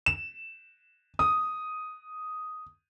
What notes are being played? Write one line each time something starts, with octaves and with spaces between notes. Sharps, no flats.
E7
D#6